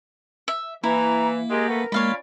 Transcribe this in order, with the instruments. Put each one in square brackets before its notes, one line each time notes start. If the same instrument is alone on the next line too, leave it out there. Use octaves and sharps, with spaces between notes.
[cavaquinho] E5
[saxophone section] E3 [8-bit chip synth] A#3 [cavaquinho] E4 [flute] A#5
[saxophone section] G#3 G4 [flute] A#4
[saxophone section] A3 B3 B4
[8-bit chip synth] G#3 A#3 [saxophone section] C#4 F4 D5 [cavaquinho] C#5 F5 B5